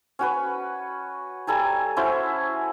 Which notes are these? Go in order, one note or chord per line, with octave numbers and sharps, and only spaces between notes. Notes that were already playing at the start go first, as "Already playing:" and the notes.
C#4 F#4 B4
G3 A4 G#5 A#5
C#4 E4 F#4 C5